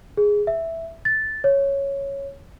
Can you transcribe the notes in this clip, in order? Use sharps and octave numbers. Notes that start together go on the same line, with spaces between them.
G#4
E5
A6
C#5